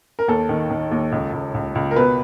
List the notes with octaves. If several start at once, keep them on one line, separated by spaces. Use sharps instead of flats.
A#4
D#2 A4
D#3
D#3
D#2
C#2
C#2
C#2
C#2
A#4
B2 B4